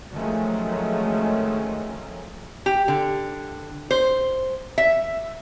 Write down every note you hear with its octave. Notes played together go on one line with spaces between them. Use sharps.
D#3 F3 F#3 G#3 A3 C#4
G4
D3
C5
E5